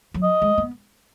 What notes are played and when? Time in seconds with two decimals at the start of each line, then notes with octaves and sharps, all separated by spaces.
0.14 F#3
0.23 D#5
0.42 G#3
0.58 B3